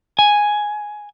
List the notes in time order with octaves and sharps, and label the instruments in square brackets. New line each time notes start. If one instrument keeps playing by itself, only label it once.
[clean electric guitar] G#5